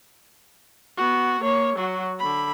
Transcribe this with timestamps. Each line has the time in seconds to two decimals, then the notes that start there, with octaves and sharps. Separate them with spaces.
0.97 B3 F#4
1.41 A#3 C#5
1.76 F#3 F#4
2.19 D3 B5